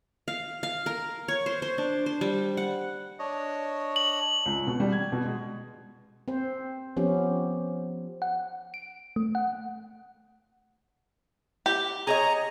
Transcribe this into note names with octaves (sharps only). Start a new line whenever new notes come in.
F5
F5
A#4
C#5
C5
C5
D4
C5
G3
F#5
D4 C#5 D#5
F#7
C#2
B2
G3
G#6
B2
G#3
C4 C5
F3 B3 C#4 G4
F#5
D7
A3
F#5
G4
G#4 C#5 D#5 A#5